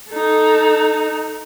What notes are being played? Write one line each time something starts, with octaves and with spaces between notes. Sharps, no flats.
D#4 A4